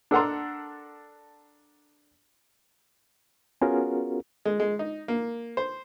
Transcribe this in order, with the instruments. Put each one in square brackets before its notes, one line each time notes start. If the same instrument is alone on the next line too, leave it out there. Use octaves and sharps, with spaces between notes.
[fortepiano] D4 A4 A#4 F#5 A#5 C6
[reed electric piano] B3 C#4 F4 F#4 G#4 A#4
[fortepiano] G#3
G#3
D#4
A#3
C5